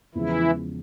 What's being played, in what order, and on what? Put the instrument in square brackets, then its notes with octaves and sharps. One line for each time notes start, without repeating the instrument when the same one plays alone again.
[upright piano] E2 C#3 F3 G#3 [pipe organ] E3 E4